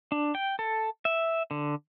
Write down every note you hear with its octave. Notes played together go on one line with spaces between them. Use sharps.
D4
G5
A4
E5
D3